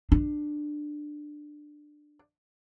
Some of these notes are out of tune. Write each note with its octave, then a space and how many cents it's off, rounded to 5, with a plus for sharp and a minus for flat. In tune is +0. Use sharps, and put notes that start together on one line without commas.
D4 +15